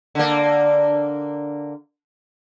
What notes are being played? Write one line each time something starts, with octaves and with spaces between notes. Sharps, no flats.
D3 A#3